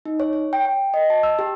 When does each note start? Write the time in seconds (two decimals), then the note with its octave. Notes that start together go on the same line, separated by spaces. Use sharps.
0.05 D#4
0.20 C#5
0.33 C#5
0.53 G5
0.65 G5
0.94 D#5
1.10 A5
1.23 E6
1.39 G4